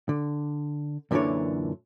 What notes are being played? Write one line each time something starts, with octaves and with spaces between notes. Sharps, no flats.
D3
F#2 A#2 D3 E3 D4 C#5